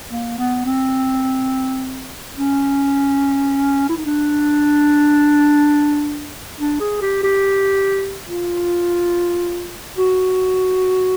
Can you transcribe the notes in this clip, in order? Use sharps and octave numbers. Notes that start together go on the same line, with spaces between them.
A#3
B3
C4
C#4
E4
D#4
D4
D4
G#4
G4
G4
F4
F#4